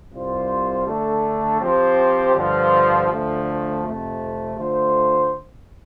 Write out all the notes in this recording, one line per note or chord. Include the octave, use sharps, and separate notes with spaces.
C2 C3 G3 F4 C5
D3 A3 D4 A4
F3 C4 G4 C5
G2 D3 F3
D2 D3 F3 A3
F2 C3 A3
D3 A3 F4 C5